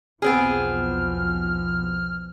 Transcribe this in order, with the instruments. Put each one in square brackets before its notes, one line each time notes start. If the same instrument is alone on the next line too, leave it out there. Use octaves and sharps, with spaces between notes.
[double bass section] B1 E2 F3 [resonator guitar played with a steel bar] B3 C4 G#4 [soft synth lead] F6